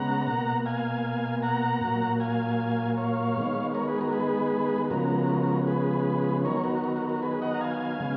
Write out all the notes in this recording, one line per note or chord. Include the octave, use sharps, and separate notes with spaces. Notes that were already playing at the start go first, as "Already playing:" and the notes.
Already playing: C#3 G#3 B3 F#5 A#5
B2 A#3
F5 G#5
F#5 A#5
A#2 F#3 A#3
F5 G#5
C#5 F5
D#3 G#3 B3
A#4 C#5
G#4 B4
F#4 A#4
G#4 B4
C#3 F3 G#3 B3 F#4 A#4
G#4 B4
D#3 F#3 B3 A#4 C#5
F#4 A#4
F#4 A#4
F#4 A#4
F#4 A#4
G#4 B4
D#5 F#5
A#5
F5 G#5
C#3 G#3 B3